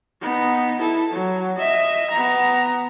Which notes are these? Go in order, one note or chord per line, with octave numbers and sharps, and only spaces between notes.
B3 D#4
E4 A4
F#3
D#5 E5
B3 A#5